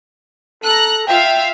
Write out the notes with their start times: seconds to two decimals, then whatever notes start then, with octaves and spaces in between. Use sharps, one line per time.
0.64 A4 A#5 F#6
1.07 F4 E5 F5 G5